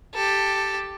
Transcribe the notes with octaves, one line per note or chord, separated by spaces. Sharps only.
G4 A4